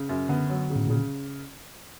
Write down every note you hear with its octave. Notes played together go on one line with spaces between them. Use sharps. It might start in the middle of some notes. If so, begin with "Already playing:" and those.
Already playing: C#3
F#2
D3 B3
F#3
C#3
A2
A#2 C#3